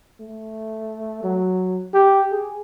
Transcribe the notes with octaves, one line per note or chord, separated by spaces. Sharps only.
A3
F#3
G4
G#4